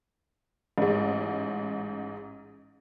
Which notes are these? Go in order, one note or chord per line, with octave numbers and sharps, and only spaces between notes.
A1 G#2